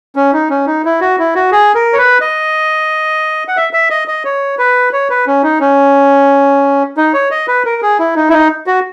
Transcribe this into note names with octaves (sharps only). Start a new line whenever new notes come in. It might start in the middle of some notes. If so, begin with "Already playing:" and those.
C#4
D#4
C#4
D#4
E4
F#4
E4
F#4
G#4
A#4
C#5
B4
D#5
F#5
E5
E5
D#5
D#5
C#5
B4
C#5
B4
C#4
D#4
C#4
D#4
C#5
D#5
B4
A#4
G#4
E4
D#4
E4
D#4
F#4